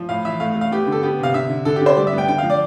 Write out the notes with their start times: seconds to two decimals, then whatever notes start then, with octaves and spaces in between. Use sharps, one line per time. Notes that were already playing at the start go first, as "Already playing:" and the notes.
Already playing: F3
0.09 A2 F5
0.25 E3 E5
0.40 A3 F5
0.51 F5
0.56 A3
0.61 F5
0.71 B3 G4
0.87 D3
0.92 A4
1.03 B3 G4
1.19 C3 F5
1.34 D3 E5
1.50 D3
1.65 D3 A4
1.76 G4
1.81 D3 C5
1.97 G3 D5
2.07 E5
2.13 B3
2.18 G5
2.28 D3 G5
2.38 F5
2.43 F3
2.50 D5